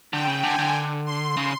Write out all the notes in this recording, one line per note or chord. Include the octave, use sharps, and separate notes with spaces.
D3 G5
C#3
D3 G#5
D3
C6
C#3